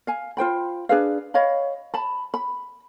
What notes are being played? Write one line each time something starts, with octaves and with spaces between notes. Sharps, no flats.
F5 G#5
F4 C5 G5 B5
D4 G#4 B4 F5
C#5 D#5 F5 B5
A5 B5
B5